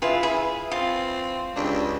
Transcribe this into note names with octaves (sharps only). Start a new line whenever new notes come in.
F3 E4 F4 G#4 B4
E4 G#4 B4
C4 F4
C#2 D4 G4